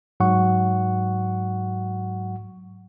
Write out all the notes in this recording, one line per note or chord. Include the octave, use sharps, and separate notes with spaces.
G#2 F#3 F#5 C#6